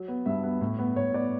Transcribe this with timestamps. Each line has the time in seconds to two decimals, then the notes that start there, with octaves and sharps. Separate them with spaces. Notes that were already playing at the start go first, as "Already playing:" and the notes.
Already playing: F#3
0.08 B3
0.26 G2 E5
0.43 B3
0.61 A2
0.79 B3
0.96 A2 C#5
1.14 B3 D5